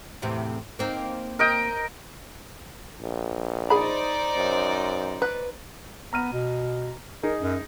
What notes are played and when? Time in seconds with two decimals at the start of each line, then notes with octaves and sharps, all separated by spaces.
0.22 E2 A2 C3
0.79 A#3 C4 D#4
1.39 A#4 D#5 G5
3.01 A#1
3.70 D#4 G#4 C5 D5 B5
4.36 F#2
5.22 B4
6.13 B3 A#5 F6 D#7
6.32 B2
7.23 D#4 G#4 A#4
7.40 F#2